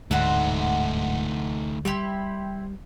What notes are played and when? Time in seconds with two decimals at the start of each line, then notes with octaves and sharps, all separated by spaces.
0.11 D1 D2 G#2 A3 C4 D#4 F#4 F#5
1.85 G3 C4 E4 G4